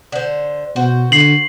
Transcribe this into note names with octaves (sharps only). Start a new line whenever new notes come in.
D3 C5
B2 F#4 C5
D3 C7 F#7